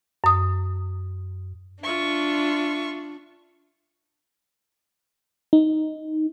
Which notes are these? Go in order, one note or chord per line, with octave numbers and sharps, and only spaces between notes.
F#2 D#6
D4 F4 E5 C#6
D#4